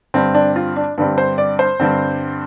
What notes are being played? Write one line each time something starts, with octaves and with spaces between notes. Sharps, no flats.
G2 D3 G3 C4
D4
F4
D4
G2 D3 G3 C4
C5
D5
C5
G2 D3 G3 C4